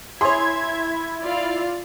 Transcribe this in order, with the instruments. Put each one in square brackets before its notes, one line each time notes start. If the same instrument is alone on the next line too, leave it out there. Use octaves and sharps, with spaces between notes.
[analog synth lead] E4 [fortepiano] G#4 C#5 [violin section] E5 G#6 [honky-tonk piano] C6
[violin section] F4 D5 F5